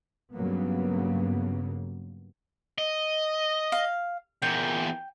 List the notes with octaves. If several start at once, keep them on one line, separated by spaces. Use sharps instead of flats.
G2 C#3 F#3 A#3 B3
D#5
F5
E2 A#2 G5